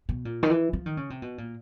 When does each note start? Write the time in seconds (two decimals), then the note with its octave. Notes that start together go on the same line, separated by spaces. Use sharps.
0.09 B2
0.25 A#2
0.43 D#3
0.50 E3
0.73 F3
0.86 D#3
0.97 C#3
1.10 C3
1.22 B2
1.38 A#2